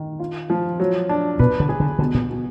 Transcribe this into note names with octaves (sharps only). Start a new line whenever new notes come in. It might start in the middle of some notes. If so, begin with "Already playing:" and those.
Already playing: D#3
F4
F3
F#3
D4
B2 B4
D3
G#4
D3
B2 D3
A#2
B2